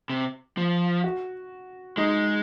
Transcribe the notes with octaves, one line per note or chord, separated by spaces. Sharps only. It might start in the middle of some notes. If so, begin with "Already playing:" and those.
C3
F3
F#4
G#3 D#4